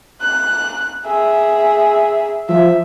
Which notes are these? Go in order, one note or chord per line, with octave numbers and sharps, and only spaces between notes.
F#6
G#4 E5
F3 E5